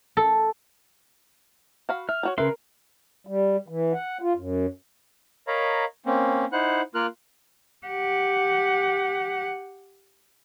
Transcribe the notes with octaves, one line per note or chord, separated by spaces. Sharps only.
A4
F#4 F5 B5
E5 F6
G3 F#4 C#5
C#3 A#4 B4 E5 C6
G3
E3
F#5
F4
F#2
A#4 C#5 D#5 F5 A#5 B5
A#3 C4 C#4
D#4 E4 C5 F#5 F#6
A#3 F4 A#4 F6 F#6
G4 F#5